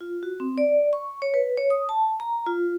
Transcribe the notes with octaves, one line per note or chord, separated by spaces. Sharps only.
F4
F#4
C4
D5
C#6
C#5
B4
C#5
D#6
A5
A#5
F4